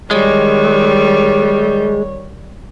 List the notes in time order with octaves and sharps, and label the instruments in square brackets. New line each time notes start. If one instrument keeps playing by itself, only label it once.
[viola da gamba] D#3 G3 [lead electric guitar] G#3 [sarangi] C#5